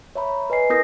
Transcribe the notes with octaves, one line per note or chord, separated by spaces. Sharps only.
C#5 E5 A#5 B5
B4 D#5 G#5 C7
B3 E4 A#4 D#6 G6 A#6